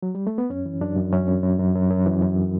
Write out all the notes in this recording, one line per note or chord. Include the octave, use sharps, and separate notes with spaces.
F#3
G3
A3
B3
F#2 C#4
E3
F#2 D4
F#2
F#2 C#4
F#2
F#2
F#2
F#2
F#2
E3
F#2